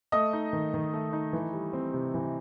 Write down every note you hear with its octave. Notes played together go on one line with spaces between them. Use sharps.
A3 D#5 D#6
D#4
D#3
D#3
A3
D#4
E3
G3
C4
C3
E3